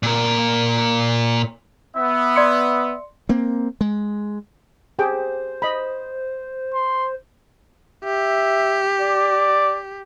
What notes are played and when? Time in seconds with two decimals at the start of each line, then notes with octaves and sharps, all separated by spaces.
0.03 A#2 A#4
1.96 B3 E5
2.36 D5 C6 C#7
3.29 A#3 C4
3.81 G#3
4.99 G4 G#4 C5 G5
5.62 D#5 B5
6.74 C6
8.04 G4 E5
9.01 D5